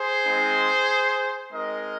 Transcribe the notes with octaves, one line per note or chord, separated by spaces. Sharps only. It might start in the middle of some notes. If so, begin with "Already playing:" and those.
Already playing: G#4 C5
G#3 C4 D#4
G#3 C4 D#4 A#4 D#5